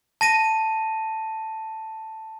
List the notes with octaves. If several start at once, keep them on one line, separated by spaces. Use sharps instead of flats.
A5 A#6 D#7